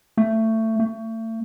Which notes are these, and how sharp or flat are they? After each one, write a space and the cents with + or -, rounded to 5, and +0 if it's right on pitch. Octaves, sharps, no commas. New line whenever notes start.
A3 +20
A3 +35